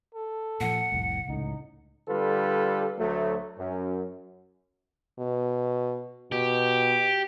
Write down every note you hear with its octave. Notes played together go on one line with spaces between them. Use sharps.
A4
A#2 F3 F#5
F1 C2 A2
C#2 A2 D#4
D3 G3 F4 A4 B4
D2 F#3 A3
F#2
B2
B2 G4